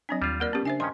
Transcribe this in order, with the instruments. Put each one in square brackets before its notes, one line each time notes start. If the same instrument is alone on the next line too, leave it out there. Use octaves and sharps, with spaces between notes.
[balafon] F#3 C4 D4 [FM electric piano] D#5 G#5
[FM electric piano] D#2 [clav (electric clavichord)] G3 F4
[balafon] A#3 A#4 D5
[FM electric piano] B3 [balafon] C#4 G4
[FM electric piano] C#3 D4 C7 [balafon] C5 E5 G#5
[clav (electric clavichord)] G2 D#3 C#4 [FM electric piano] D#5 G#5 A5 [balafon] C6